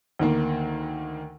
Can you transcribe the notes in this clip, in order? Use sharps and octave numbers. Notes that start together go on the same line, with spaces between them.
D2 D#3 A#3